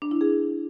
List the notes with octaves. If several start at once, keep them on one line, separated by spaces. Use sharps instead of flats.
D4
E4
G#4